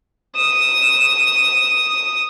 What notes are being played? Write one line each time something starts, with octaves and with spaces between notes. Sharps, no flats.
D#6 E7